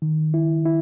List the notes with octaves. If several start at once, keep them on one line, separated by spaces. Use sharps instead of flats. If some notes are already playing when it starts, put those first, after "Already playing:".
D#3
E4
E4